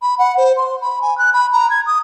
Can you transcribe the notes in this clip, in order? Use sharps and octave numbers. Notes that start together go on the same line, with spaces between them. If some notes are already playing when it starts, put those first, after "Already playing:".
B5
F#5
C5
C6
B5
G#5
F#6
B5
A#5
G#6
D#6